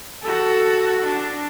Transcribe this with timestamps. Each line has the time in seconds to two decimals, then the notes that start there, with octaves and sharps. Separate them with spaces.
0.23 F#4 A4
1.05 D4